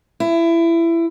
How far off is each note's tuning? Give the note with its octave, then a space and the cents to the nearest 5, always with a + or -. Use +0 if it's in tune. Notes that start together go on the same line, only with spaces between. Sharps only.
E4 +20